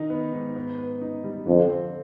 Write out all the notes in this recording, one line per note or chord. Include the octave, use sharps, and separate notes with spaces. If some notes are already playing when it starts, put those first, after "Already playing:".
Already playing: D#3 D#4
B3
G#2
B3
B4
D#4
G3
F2 D3
C4